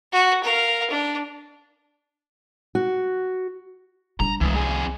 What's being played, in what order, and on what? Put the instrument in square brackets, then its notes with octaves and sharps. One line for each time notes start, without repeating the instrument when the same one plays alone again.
[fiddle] F#4
A#4 F5
D4
[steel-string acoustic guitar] F#4
[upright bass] G3 D4 [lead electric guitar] A#5
[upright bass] C2 [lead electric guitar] E3 G#3
[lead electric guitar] F2 G#4